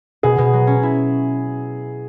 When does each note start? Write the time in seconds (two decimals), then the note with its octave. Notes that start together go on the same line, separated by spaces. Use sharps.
0.23 B2 G#4
0.38 B2
0.53 F#3
0.67 C#4
0.83 E4